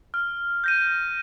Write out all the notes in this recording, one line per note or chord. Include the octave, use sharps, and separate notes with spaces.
F6
G6 A#6 D#7